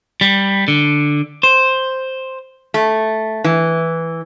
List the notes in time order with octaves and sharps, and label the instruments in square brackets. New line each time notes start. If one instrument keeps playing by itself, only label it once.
[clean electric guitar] G3
D3
C5
[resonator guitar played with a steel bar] A3
E3